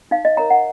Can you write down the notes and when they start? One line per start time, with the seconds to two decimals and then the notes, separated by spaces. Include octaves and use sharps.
0.11 D#4 F5
0.25 D#5
0.37 A#4 C#5 A#5
0.50 F#5